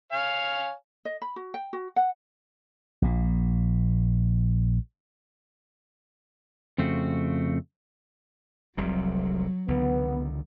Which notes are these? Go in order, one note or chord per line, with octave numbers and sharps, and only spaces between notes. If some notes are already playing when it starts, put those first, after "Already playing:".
C#5 F5 G#5
D#5
B5
F#4
G5
F#4
F#5
A#1 A#2
F2 C#3 A3 C4 F#4
F1 C2 C3 F#3
C#2 D3 D#3 B3